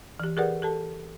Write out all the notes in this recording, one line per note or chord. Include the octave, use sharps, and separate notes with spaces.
E3 G4
G4 G#4 A#4 B4 D5 F#5
G4 A4 A5